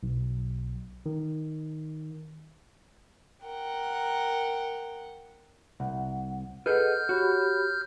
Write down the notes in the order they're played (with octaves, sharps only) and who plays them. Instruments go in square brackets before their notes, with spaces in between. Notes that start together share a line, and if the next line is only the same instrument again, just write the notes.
[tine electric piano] B1
D#3
[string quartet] A#4 F#5 G5
[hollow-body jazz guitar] C2 [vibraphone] F#5
[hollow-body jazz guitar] G#4 A4 B4 [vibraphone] D#5 F#5 [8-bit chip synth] F6 G6
[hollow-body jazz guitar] F#4 [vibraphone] G4 C#5 B5